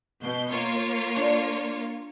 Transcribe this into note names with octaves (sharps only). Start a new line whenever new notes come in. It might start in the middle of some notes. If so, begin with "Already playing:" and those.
B2 G6
A#3 F4 C#5
D4